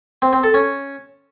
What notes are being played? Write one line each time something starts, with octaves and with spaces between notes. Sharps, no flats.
C4
C4
A4
C#4